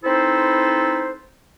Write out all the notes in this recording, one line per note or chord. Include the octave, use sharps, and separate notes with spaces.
C4 D#4 E4 A4 B4 C5